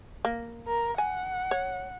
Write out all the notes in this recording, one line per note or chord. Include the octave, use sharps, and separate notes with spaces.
A#3
A#4
F#5 G#5
C#5